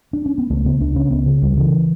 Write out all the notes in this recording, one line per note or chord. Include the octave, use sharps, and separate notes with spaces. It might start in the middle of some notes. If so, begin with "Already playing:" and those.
D4
C#4
B3
C#2 A3
C#3 B3
C#2 D4
C#3 C#4
C#2 B3
C#3
C#2 G3
C#3 E3